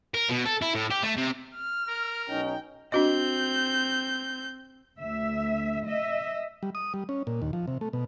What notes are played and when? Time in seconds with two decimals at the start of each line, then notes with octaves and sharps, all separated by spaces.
0.14 A#4
0.29 B2
0.46 A4
0.62 E4
0.75 A2
0.91 G4
1.03 A3
1.17 C3
1.55 F6
1.88 A#4
2.29 B1 C#4 D#4 G5
2.92 C4 D4 F#4 D#5 G6
5.00 D2 E5
5.86 D#5 E5
6.63 G3
6.75 D#6
6.94 G3
7.09 C#4
7.27 A#2
7.42 D#2
7.53 F3
7.67 C3
7.81 A3
7.93 B2